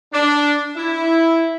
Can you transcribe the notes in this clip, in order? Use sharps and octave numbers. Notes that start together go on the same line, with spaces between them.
D4
E4